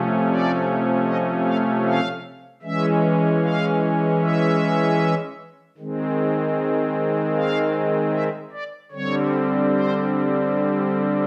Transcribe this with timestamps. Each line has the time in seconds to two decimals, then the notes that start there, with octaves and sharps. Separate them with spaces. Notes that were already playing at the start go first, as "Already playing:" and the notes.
Already playing: C3 F3 A3 C#4
0.28 D5
1.05 D#5
1.45 F5
1.85 F5
2.62 E3 G#3 C#4 E5
3.42 F5
4.21 E5
5.77 D#3 G#3 C4
7.35 F5
8.12 E5
8.52 D5
8.91 D3 G3 C4 C#5
9.70 C5